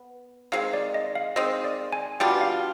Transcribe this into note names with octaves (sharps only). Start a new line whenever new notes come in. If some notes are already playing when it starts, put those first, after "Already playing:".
Already playing: B3
D#3 G#3 C4 F5
D5
D#5
F5
D#3 G#3 C4 D#5
D5
G#5
B2 G3 D4 F4 G5
F5